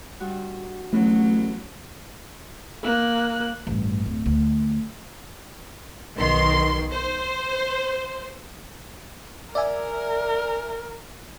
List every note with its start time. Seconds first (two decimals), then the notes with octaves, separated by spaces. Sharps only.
0.20 G2 G3 F#4
0.93 A1 F#3 A3 B3 C#4
2.83 A#3 F#6
3.67 A1 G2
4.06 D1
4.26 D2
6.16 B1 D#3 C6
6.93 C5
9.55 A#4 D5 E5 G#5